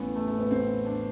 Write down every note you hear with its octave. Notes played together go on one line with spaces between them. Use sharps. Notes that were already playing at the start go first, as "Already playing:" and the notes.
Already playing: A1 A2 E3 B3
A3
A3
B3
C4
D4